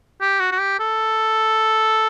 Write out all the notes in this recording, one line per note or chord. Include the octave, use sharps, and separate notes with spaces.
G4
F#4
F#4
G4
A4